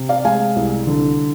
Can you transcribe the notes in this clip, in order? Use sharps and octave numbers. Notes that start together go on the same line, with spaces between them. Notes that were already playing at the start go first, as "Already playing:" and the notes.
Already playing: C3
D5 F5
G#3 F5 G#5
C2
D3